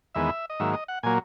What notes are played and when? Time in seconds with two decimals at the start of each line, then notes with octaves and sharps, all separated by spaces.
0.15 E2 D#3 G#3 B3 E5
0.50 D#5
0.60 G#2 D#3 F#3 A#3 E5
0.73 D#5
0.88 F#5
1.03 A#2 F#3 A#3 G#5